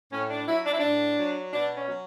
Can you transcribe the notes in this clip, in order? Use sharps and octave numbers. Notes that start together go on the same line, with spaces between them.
A2 C#4
D4
F#3 E4
D4
E4
A2 D4
F#3
B2 D4
C#4
F#3